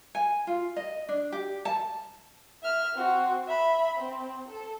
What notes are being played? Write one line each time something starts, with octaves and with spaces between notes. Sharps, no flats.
G#5
F4
D#5
D4
G4
A5
E5 F6
C4 F#4
E5 B5
C4
A4